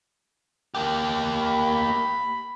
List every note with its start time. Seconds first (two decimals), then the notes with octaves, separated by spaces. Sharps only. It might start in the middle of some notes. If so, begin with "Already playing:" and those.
0.75 A#3 G4
1.34 B5